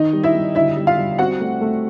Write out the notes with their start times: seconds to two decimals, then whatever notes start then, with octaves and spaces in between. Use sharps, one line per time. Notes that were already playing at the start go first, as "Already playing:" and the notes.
Already playing: D#3 D#4 D#5
0.13 G3
0.23 E4 E5
0.34 G3
0.55 D3 E4 E5
0.77 G3
0.87 F4 F5
0.98 G3
1.19 C4 F#4 F#5
1.40 A3
1.61 A3